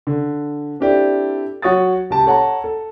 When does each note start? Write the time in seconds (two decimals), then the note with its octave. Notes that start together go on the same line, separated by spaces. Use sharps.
0.07 D3
0.80 C4 D4 E4 G4 A4 D5
1.62 F#3 F#4 C#5 D#6 A6
2.10 C#2 G4 A5
2.26 A4 C#5 F#5 A5 A#5
2.64 A4